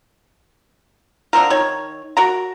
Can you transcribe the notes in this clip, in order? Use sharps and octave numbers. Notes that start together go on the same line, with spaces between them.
D3 F3 C4 A#4
D#3 C#5
F#4 A#4 A#5